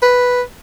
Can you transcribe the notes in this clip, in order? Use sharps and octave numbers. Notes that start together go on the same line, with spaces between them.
B4